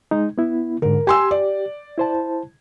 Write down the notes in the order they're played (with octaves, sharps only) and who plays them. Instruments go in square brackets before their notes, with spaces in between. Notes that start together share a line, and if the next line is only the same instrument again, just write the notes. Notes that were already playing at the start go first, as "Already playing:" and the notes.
[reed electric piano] G#3 D#4
B3 E4
[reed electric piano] G#2 D3 [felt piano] A#4
[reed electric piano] G4 [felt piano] G#5 C6 E6
[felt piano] D5
[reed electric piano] E4 C5 A5